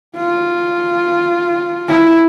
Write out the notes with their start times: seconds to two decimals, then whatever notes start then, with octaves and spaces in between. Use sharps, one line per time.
0.16 F4
1.88 E4